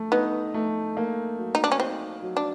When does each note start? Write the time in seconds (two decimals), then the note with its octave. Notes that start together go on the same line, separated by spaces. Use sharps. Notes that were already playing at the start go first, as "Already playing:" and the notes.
Already playing: A3
0.12 B3 D#4
0.54 A3
0.97 A#3
1.38 F#3
1.55 D#4
1.64 D4
1.72 C#4
1.80 C4 D#4
2.22 F#3
2.37 D4